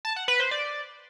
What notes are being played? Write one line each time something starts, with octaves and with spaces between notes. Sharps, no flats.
A5
F#5
B4
C5
D5